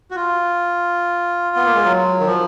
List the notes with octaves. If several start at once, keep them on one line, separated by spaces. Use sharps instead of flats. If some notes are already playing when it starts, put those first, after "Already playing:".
F#4
F4
B3
A#3
G#3
F#3
D#3
F3